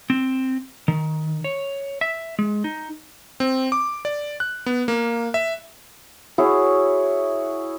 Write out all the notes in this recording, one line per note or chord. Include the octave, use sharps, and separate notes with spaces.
C4
D#3
C#5
E5
G#3
D#4
C4
D6
D5
F#6
B3
A#3
E5
E4 F#4 G#4 C#5